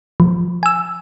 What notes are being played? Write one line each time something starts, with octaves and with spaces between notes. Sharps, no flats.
F3
G#5 E6